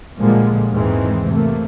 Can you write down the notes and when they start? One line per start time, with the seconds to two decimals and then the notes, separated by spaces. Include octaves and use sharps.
0.19 A#2 D3 F3 G3 G#3 A#3
0.71 E2 G#2 D#3 E3 G#3 C4
1.29 C3 A3 A#3